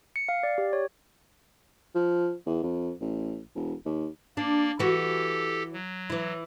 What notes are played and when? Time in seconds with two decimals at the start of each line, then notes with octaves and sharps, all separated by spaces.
0.16 C#7
0.29 F5
0.43 D5
0.58 G4
0.73 C#5
1.95 F3
2.46 E2
2.63 F2
3.01 A1
3.55 E1
3.85 D#2
4.37 A#3 D4 D5
4.79 E3 F#4 G4 A4
5.73 F#3
6.10 E3 E4